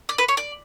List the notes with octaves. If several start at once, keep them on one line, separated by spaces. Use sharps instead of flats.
D5
B4
C#5
D5